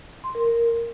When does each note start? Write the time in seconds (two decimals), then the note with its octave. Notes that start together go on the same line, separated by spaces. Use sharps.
0.24 C6
0.35 A#4
0.46 A#4